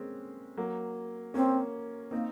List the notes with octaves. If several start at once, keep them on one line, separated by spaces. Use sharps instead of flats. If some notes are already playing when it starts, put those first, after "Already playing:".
Already playing: G#3 A#3 C4 C#4
F#3 A#3
A#3 C4 C#4
A#3 C4 D#4